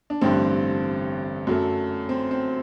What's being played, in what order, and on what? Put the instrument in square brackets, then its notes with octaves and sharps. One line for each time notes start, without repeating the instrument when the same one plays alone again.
[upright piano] D4
A1 G2 D3 C4
F#2 F#3 A3
C4
C4